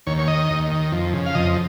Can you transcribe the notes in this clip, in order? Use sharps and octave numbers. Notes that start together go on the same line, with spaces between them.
D#2 C#5
C#5
D#3 D#5
D#2
D#3
F2
C#3
F5
F2 D#5